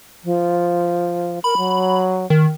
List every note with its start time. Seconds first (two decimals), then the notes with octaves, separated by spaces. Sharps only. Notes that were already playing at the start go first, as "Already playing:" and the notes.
0.24 F3
1.44 A#4 B5
1.57 F#3
2.30 D#3